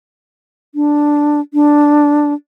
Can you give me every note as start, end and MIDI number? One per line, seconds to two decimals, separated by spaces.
0.75 1.41 62
1.54 2.34 62